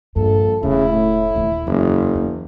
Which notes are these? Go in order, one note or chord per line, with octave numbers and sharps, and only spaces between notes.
A#1 G2 A4
E1 C#3 A3 E4
A2
D#1 D#3
F#1 E2
E2